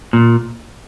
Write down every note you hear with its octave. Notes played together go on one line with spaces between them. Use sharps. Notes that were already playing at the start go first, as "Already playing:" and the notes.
A#2